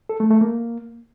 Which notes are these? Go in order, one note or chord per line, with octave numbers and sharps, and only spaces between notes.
A4
A3
A3
A#3